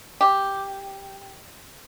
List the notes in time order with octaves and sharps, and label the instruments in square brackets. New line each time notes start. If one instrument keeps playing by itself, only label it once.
[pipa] G4